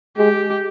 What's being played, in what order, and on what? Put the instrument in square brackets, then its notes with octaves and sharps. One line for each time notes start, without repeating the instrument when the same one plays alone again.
[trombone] G#3 [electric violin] G4